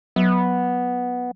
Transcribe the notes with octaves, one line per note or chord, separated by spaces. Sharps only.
F#3 B3